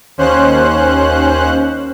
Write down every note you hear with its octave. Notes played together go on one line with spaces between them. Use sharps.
D#2 C#4 C5 F#6